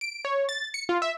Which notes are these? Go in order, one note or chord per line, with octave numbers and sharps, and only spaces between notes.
D7
C#5
A6
C#7
F4
E5